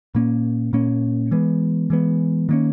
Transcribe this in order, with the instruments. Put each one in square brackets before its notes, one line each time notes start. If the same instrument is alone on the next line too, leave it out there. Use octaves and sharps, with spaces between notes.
[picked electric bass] A#2 A#3 C#4
A#2 A#3 C#4
E3 G#3 B3
E3 G#3 B3
D#3 A#3 C#4